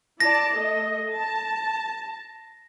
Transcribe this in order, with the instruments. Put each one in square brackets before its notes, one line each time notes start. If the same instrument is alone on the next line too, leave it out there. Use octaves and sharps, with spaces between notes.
[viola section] E4 D5 A5 [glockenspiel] A#6
[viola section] A3 A4 D#5
A5